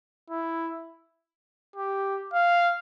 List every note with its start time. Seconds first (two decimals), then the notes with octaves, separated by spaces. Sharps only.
0.30 E4
1.76 G4
2.33 F5